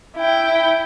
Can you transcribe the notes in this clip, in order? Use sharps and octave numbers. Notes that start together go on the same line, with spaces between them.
E4 G5